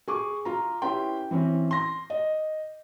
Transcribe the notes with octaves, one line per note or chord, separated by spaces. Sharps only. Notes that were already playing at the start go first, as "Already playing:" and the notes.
G#4 C#6 D6
F4 A#5
C#4 E4 G4 B4 G5 C6
E3 C4 C#4
C6 A#6
D#5